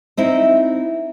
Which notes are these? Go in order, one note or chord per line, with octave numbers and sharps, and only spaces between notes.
C4 D#4 E4